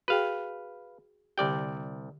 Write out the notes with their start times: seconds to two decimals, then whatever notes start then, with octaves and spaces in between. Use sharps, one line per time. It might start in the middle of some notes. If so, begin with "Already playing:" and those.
0.08 F#4 G#4 B4 F5 G5
1.38 C2 D3 G4 D5 G5